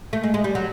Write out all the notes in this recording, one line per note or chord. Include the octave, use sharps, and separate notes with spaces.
A3
G#3
G#3
G3
F#3